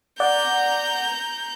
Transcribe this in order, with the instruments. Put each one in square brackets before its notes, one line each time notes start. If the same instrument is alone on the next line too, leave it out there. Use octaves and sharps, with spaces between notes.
[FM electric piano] D5 F#5 [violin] A#5 G6